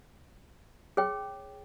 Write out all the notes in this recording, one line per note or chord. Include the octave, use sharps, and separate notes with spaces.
G#4 C#5 G5